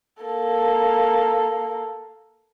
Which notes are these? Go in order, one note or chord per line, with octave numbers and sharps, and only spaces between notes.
A#3 A4